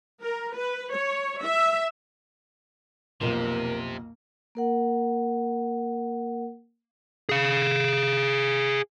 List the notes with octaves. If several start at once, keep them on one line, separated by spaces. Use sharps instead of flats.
A#4
B4
C#5
E5
B1 F2 C3 A#3 A#4
A#3 A#4 F#5
G#4 F5